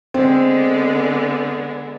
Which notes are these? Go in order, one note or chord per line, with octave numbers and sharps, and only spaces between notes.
D3 G#3 B3 C4